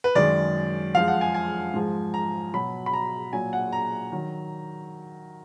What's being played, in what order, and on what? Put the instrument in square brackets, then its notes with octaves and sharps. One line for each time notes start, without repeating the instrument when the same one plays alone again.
[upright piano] B4
F#2 D#3 G#3 D5
F2 F3 G#3 F5
F#5
G#5
G#5
G#2 F3 G#3
A#5
B2 F#3 B5
B5
A#5
A#2 F#3 G#5
F#5
A#5
D#3 F#3